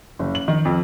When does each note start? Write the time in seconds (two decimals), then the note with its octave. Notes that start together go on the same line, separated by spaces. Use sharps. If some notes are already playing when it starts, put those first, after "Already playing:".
0.19 F#1
0.35 F#7
0.48 D#3
0.65 F2